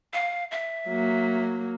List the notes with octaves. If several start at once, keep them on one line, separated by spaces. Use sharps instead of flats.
F5
E5
F#3 A#3